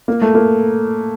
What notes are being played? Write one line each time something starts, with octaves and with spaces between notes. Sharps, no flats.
A#3
A3
A#3